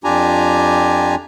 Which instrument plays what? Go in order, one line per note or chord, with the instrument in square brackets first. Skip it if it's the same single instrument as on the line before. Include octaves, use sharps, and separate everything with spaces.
[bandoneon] F2 D4 F4 G4 G#5 A#5